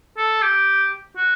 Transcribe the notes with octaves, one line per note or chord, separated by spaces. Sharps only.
A4
G4
F#4